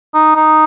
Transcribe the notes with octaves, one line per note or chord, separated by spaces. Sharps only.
D#4
D#4